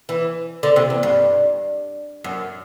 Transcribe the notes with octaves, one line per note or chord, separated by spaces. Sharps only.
E3
D3
C3
E2
G2
F#2